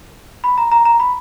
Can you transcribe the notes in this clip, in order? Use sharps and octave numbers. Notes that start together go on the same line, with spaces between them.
B5
A#5
A#5
A#5
B5